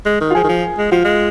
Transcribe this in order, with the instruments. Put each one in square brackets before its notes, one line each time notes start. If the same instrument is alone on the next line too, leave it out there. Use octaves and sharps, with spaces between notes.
[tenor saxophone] G#3
D#3
[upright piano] F4
[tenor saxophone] F3 [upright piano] G#4
[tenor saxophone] D#3
F3
G#3
[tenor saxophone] F3 [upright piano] F4
[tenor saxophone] G#3